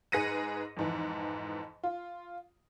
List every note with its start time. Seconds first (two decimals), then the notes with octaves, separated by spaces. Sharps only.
0.12 G#2 G#4 B4 A#6 C#7 D#7
0.77 F2 G#2 E3
1.83 F4